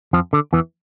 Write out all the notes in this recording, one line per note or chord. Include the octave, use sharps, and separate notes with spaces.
F2 F3
D3
E2 E3